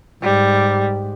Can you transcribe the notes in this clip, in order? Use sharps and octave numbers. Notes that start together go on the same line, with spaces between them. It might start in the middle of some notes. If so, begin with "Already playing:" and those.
G#2 G3